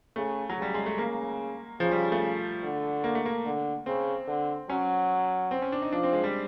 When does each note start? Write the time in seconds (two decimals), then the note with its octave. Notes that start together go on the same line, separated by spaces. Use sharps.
0.16 C#3 A3
0.50 F#3
0.58 C#3 G3
0.74 G#3
0.86 A3
0.98 C#3 A#3
1.80 C#3 F3
1.91 G3
2.12 A3
2.63 D3
3.04 A#3
3.15 A3
3.26 A#3
3.45 D3
3.86 C#3 C4
4.27 D3
4.69 F#3 C#4
5.51 C4
5.62 C#4
5.72 D4
5.82 D#4
5.92 F3 D4
6.03 C4
6.13 G#3
6.24 G3